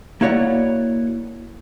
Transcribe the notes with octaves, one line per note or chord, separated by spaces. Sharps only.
A#3 E4 F#4 C#5 D5 F#5